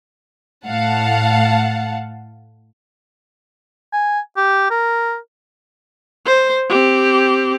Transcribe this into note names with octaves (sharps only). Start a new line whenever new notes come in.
A2 F5 F#5 A5
G#5
G4
A#4
C5
C4 G4